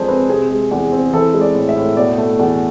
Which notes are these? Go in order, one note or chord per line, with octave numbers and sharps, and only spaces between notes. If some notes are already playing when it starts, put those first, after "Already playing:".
Already playing: F2 D3 G#3 G#4 C5
C4 B4
C3 G#4
G#3
E2
C4
E3 A4
G#3
D5
A2
E5
A2
B2 D5
A3
E2